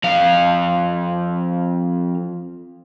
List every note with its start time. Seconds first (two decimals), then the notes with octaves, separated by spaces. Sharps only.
0.04 F2 F5